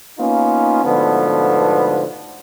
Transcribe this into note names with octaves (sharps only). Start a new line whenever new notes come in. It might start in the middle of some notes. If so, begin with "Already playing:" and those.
A#3 B3 C#4 D#4 F4
G#2 B2 D3 F3 A3 B3